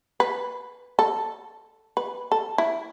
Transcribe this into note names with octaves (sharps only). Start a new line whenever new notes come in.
B4
A4
B4
A4
E4